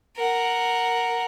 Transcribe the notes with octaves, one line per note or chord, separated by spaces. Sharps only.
A#4 F#5